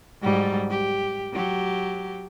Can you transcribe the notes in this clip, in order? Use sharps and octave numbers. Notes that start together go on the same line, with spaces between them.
G#2 F#3 G3
G4
F#3 G4